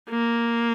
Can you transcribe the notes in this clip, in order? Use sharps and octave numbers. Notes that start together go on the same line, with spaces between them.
A#3